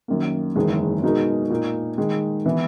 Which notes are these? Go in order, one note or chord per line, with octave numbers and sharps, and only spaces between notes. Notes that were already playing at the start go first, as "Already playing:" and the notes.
F#2 D#3 A#3
F#1 E2 D#3 G#3
B2 G#3 D#4 A#4
A#2 A#3 D#4
D#3 G#3 D#4
E3 B3 E4